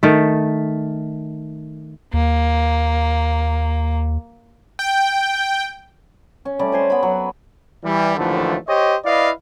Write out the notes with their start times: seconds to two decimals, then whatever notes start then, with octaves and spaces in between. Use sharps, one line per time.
0.03 D#3 A3
2.13 D#2 A#3
4.79 G5
6.45 C#4
6.59 G3 A3 C#4 D5
6.72 C5 G#5 C6
6.90 B3 B5
7.03 F#3
7.83 E3 G3
8.16 D#2 A2 D3 E3 F3 A3
8.67 G4 C5 C#5 D#5
9.04 E4 B4 D5 D#5 F5